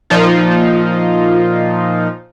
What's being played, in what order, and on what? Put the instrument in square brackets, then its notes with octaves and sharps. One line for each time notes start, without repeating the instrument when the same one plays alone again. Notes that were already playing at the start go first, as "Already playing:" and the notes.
[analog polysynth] A#2 F3 D#4 F4